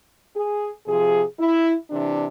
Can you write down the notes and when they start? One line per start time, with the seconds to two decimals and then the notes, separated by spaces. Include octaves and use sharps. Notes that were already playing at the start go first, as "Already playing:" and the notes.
0.36 G#4
0.87 C3 F3 G#4
1.39 E4
1.90 C3 E3 D4